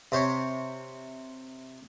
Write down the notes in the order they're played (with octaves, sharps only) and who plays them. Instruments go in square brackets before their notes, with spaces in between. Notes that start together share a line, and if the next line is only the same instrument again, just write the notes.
[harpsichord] C3 C5 C#5